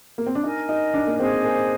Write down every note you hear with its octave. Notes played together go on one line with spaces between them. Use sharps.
A#3
C4
D4
D#4 A#4 D#5 G#5
D#4
D4
A#3
C4 G#4 C5 D#5 G#5
A#3